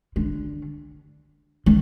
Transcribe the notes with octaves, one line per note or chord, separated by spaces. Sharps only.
D3
D#3